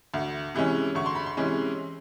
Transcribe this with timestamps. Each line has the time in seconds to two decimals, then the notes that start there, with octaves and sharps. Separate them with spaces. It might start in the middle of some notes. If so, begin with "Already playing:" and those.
0.14 D2
0.54 C3 E3 G#3 C#4
0.95 D2 C#6
1.06 C6
1.15 B5
1.26 C6
1.37 C3 E3 G#3 C#4